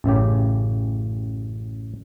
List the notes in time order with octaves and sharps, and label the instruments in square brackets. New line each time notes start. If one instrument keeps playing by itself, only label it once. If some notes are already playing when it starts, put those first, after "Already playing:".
[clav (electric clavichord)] A1 F#2 C#3 G4